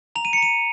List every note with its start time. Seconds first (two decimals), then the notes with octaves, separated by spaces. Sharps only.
0.16 A#5 F7
0.25 D#7
0.33 C#7
0.38 A#5 D#7